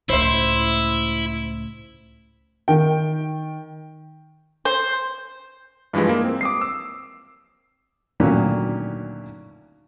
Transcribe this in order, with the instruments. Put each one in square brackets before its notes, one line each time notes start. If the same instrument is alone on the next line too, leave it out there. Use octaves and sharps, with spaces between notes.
[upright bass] C#2 A2 [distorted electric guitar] E4 [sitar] C5 E5
[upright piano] D#3 G5
[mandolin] C5
[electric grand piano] G2 E3 F3 G3 G#3
A#3
C4
D6 D#6 C7
E6
[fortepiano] D2 A#2 D#3 F#3 C#4